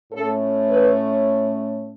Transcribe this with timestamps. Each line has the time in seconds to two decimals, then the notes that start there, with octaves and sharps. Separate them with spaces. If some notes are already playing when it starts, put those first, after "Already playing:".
0.12 A2 A3 C#4 A4
0.69 B4